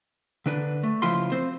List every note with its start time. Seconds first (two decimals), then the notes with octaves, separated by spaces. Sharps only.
0.46 D3 D4 B4
0.83 A3
1.02 C#2 F3 E4 F4 C6
1.32 C4 C5